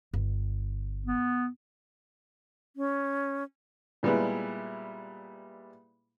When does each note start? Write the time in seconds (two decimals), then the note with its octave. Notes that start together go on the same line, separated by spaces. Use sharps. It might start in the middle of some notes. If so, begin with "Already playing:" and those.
0.14 G1
1.06 B3
2.76 C#4
4.03 A#2 G3 G#3 B3 E4